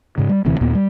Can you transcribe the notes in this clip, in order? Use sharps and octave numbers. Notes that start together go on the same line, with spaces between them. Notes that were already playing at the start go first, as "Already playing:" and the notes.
G#2 C#3
G3
E1 D2 C3 E3
D#2 A#2 B3
G3